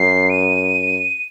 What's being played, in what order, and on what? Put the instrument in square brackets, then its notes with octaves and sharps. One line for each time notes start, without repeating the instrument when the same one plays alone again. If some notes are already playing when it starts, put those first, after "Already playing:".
Already playing: [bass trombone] F#2 [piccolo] C7
[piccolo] D#7